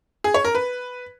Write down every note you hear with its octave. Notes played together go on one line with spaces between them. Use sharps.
G#4
C#5
A#4
B4